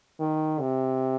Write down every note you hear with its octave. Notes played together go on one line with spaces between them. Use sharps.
D#3
C3